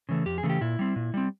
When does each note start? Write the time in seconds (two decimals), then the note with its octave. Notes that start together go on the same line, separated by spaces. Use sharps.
0.09 C#3 E3 A3
0.26 F2 G4
0.38 G#4
0.43 C#3 E3 A3
0.49 G4
0.61 A#2 E4
0.79 G3 C4
0.96 A#2
1.14 G3 C4